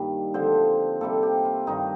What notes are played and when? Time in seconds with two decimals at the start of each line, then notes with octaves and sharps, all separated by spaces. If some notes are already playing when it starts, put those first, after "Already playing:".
Already playing: G2 D#3 G3 A#3
0.34 D3 F3 C4 C5
1.01 C3 G3 A#3 A4
1.23 G4
1.45 F4
1.67 G2 D#3 A#3 D#4